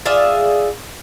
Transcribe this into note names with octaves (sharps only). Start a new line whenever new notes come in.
F4 G#4 D5 E5